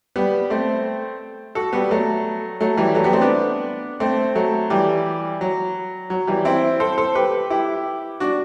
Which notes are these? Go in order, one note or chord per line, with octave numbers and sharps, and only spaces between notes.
G3 B3
A3 C4
F#4 A4
G3 B3
F#3 A3
F#3 A3
E3 G3
F#3 A3
G3 B3
A3 C4
B3 D4
A3 C4
F#3 A3
E3 G3
F#3
F#3
E3 G3
C4 E4
A4 C5
A4 C5
G4 B4
E4 G4
D4 F#4